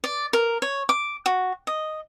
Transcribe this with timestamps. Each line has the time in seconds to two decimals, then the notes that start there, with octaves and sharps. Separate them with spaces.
0.04 D5
0.33 A#4
0.62 C#5
0.89 D6
1.26 F#4
1.67 D#5